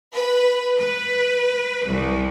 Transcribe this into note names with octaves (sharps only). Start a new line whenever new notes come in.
B4
B4
C2